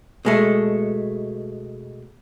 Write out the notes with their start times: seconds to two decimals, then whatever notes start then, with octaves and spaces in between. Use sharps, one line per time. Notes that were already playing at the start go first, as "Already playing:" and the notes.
0.25 B2 G#3 A3